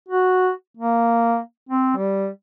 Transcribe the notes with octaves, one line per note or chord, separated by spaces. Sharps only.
F#4
A#3
C4
G3